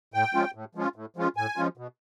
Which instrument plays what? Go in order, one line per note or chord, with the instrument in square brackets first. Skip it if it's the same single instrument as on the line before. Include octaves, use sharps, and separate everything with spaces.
[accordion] A2 G5
F3 G#3 C#4 F4
A2
F3 G#3 C#4 F4
A2
F3 G#3 C#4 F4
A2 G#5
F3 G#3 C#4 F4
B2